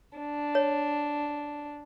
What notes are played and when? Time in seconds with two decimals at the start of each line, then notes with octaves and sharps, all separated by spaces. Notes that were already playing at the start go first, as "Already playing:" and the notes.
0.18 D4
0.55 C#5